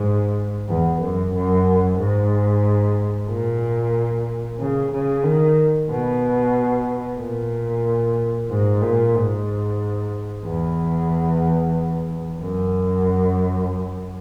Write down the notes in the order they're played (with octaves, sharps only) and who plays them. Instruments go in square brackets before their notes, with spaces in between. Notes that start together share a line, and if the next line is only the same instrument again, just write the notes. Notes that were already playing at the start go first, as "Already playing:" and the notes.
Already playing: [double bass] G#2
E2
F#2
F#2
G#2
A#2
C#3
C#3
D#3
B2
A#2
G#2
A#2
G#2
E2
F#2